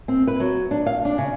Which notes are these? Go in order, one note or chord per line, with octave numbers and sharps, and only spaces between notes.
C4
B4
F#3
D4
F5
D4
C#3